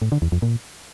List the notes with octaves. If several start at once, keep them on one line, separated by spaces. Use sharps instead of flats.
A2
D3
E2
F2
A#2